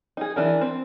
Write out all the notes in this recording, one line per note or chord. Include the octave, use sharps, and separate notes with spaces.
D#4 G#4
E3 D4 A#4
C4